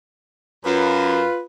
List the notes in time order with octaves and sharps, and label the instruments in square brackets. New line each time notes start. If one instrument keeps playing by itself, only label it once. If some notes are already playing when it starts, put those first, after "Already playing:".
[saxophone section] F#2 [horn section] F4 B4